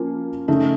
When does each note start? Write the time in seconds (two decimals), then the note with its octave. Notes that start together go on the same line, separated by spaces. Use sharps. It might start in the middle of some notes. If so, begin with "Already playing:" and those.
Already playing: F3 A#3 C#4 F4
0.48 C#3 A3 D#4